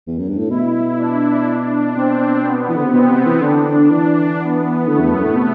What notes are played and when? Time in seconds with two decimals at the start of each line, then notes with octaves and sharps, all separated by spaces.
0.07 E2
0.18 F#2
0.29 G2
0.39 A2
0.50 B2 E4
0.99 D4
1.96 B2 C4
2.44 B3
2.69 E3
2.77 D3
2.86 C3
2.93 B2 C4
3.09 C3
3.26 E3
3.42 D3 D4
3.91 E3
4.40 B3
4.88 D3 A3
5.00 E2
5.12 F#2
5.24 A2
5.36 C3